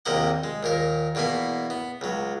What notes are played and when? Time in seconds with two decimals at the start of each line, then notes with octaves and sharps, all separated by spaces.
0.05 A#1 D#2 C3 A#3 D#5 F#5
0.44 G#3
0.63 D#2 A#2 A#4
1.15 E2 B2 A#3 B3 G#5
1.70 B3
2.01 C#2 F#3